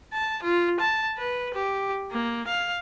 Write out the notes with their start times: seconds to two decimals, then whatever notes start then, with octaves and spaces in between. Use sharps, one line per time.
0.13 A5
0.43 F4
0.80 A5
1.19 B4
1.54 G4
2.12 A#3
2.48 F5